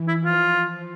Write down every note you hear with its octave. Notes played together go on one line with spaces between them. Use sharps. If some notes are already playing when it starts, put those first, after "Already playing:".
Already playing: E3
E4
F3 F4